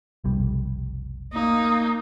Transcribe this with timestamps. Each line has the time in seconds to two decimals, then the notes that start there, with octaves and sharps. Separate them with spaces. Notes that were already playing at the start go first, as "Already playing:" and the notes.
0.24 F1 B1 G3
1.33 A#3 D#4